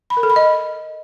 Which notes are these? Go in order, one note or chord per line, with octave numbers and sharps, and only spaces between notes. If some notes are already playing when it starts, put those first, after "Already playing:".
B5
A#4
A4
B5
D#5